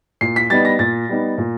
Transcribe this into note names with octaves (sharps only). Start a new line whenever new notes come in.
A#2 C7
B6
G3 B3 D#4 A6
A#6
A#2 A6
G3 B3 D#4
A#2